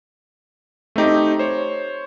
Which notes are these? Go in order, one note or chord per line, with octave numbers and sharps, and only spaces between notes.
A3 C4 D#4 G4
C5 C#5